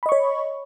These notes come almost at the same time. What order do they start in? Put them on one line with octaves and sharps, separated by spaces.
B5 D#5 C#6 C#5